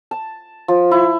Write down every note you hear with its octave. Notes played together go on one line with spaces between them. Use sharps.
A5
F3
E4